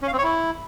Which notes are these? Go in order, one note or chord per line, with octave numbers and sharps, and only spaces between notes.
C#4
F5
C4
C#5
E4